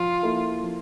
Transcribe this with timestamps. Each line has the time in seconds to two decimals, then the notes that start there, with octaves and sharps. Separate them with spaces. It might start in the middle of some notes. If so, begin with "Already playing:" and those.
Already playing: F3 F4
0.23 A#3 E4 A4
0.63 F3